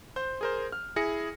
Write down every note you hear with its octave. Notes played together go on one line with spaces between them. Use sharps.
C5 G6
G#4 A#4 C5
F6
E4 G#4 A#6 C#7